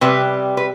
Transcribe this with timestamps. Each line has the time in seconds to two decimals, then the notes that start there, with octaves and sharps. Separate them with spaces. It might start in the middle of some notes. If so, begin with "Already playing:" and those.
0.01 C3 G3 B4
0.57 B4